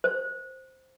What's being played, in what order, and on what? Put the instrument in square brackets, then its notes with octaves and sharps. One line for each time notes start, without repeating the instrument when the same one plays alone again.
[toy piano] C5